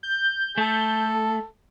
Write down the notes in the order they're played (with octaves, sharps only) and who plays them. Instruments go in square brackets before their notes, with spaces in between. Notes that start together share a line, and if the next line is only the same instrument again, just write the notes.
[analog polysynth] G6
[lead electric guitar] A3 [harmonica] A4